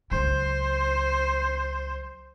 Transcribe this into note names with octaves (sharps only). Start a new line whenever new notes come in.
C#2 F#3 C5